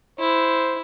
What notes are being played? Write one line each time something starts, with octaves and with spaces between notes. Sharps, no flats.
E4 C5